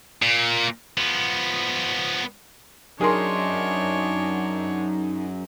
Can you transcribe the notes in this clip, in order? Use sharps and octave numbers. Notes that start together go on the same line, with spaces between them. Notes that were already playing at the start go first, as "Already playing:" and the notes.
A#2
F3 B3
F#2 D4 D#4 G#4 A#4 C#5 C6